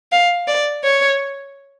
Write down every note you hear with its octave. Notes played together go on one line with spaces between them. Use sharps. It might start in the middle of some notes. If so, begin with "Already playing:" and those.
F5
D5
C#5